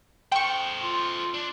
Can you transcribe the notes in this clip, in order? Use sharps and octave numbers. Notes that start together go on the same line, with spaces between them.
A4 C5 G5 C#6
F4
D4